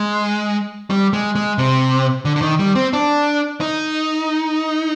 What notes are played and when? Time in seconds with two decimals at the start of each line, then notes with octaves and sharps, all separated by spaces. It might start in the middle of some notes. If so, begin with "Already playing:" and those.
Already playing: G#3
0.90 G3
1.13 G#3
1.35 G#3
1.58 C3
2.25 D3
2.36 D3
2.42 D#3
2.59 G3
2.75 C4
2.93 D4
3.61 D#4